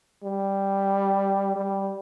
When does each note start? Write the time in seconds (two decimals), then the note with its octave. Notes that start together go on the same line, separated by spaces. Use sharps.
0.24 G3
1.56 G3